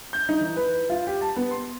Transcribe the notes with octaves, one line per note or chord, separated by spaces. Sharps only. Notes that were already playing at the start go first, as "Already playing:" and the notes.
G6
D#4
E3
B4
F4
G4
A5
B3
C6